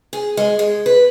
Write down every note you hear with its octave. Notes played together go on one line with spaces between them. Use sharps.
G#4
G#3
G#3
B4